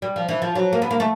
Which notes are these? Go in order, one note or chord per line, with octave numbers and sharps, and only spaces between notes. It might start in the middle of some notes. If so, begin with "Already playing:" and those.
G3
F3
E3
F3
F#3
A#3
B3
A#3
A3